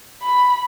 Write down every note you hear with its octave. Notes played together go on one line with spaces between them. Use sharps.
B5